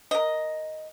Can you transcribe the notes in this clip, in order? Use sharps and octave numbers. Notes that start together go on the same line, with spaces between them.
A#4 D#5